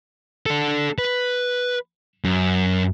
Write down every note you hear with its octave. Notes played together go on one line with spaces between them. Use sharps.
D4 A4
B4
F#2